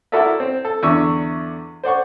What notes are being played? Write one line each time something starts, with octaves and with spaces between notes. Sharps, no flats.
E4 F#4 A4 A#4 D5 E5
C4
A4
E2 D3 D5 E5 C#6 E6
C5 D5 F#5 C#6